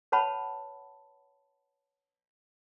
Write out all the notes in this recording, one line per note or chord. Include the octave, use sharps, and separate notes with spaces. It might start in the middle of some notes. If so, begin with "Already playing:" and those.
B4 C#5 F#5 A5 B5